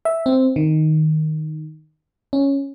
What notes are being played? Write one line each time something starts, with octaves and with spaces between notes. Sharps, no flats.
E5
C4
D#3
C#4